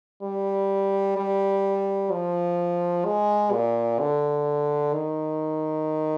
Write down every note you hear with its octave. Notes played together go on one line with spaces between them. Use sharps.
G3
G3
F3
G#3
A#2
D3
D#3